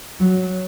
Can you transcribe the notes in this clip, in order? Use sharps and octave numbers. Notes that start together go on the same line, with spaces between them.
F#3